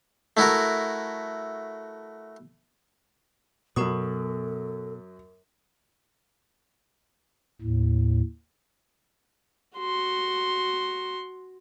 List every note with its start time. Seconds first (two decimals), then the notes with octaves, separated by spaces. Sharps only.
0.37 A3 E4 F#4 A#4
3.76 F#2 B2 F#3 B3 A4 A#4 C#6 D#6
7.61 D#2 A2
9.77 F#4 C6